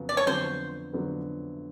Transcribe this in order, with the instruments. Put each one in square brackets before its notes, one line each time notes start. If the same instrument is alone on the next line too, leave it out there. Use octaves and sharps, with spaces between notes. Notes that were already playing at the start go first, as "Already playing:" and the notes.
Already playing: [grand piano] F2 C#3 F#3 B3
[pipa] D5
C#5
[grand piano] F2 D3 F#3 B3 [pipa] C5
[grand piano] F2 D3 F#3 B3